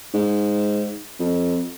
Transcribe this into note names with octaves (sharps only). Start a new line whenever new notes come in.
G#2
F2